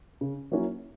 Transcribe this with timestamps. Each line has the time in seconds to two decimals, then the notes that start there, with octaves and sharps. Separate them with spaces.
0.21 C#3
0.52 F#3 A#3 C#4 E4